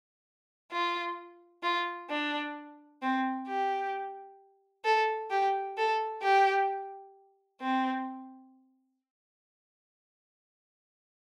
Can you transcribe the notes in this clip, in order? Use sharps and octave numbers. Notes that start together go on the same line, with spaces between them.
F4
F4
D4
C4
G4
A4
G4
A4
G4
C4